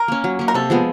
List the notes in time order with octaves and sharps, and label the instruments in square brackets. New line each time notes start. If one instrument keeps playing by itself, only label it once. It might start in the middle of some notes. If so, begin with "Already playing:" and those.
Already playing: [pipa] A#4
[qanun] A#3 C#4
F#3
A#3 C#4
[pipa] A#4
[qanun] C3 [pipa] A4
[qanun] F3 G#3 B3